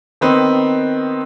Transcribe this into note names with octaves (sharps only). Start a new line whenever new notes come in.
D#3 B3 C4 D#4 B4